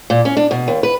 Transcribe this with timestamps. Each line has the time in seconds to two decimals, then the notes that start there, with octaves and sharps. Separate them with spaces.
0.10 A#2
0.25 C#4
0.37 D4
0.51 B2
0.68 D#2
0.83 B4